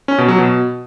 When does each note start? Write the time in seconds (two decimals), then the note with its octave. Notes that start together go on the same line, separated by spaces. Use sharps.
0.08 C#4
0.18 B2
0.28 F#3
0.38 B2